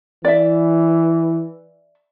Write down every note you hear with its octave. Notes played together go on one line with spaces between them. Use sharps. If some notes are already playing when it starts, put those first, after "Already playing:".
E3 D5 E5